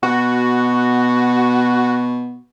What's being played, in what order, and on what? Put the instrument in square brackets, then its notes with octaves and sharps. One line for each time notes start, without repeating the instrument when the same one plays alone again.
[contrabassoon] B2 [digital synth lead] F#4